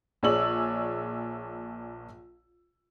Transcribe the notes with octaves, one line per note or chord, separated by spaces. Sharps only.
A#1 G#4 C#5 D5 E6 F#7